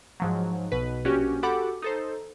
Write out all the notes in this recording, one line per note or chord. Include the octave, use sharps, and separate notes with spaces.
G#2 F3 F#3
B1 B2 B4
A#1 C#4 F#4 G4
F#4 G4 A4 F#5 B5 D6
D#4 A4 C5